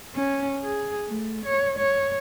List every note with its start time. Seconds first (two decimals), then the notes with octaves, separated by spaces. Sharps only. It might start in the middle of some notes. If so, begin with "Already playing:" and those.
0.15 C#4
0.63 G#4
1.08 A3
1.45 C#5
1.79 C#5